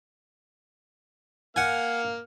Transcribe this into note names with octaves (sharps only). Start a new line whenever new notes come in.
A#3 F5 F#5 G#5 F6